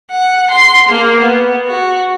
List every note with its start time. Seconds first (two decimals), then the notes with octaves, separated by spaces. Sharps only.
0.10 F#5
0.52 C6
0.88 A#3
1.20 B3
1.66 F#4